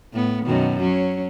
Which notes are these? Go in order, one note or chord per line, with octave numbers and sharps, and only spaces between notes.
A2 B3
F#2 B2 D#3
F#3 C#4